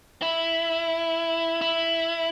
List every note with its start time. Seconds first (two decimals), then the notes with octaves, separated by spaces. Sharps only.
0.22 E4
1.62 E4